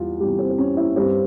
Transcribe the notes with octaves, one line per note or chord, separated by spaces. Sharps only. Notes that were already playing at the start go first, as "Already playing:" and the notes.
Already playing: E2 G3 F4
E2 C3 G3 G4
C4
C4
C#4
E4
G2 G3 C4